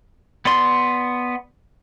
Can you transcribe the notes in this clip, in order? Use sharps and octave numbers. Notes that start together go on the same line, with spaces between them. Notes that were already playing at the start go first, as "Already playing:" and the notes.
B3 D5 C6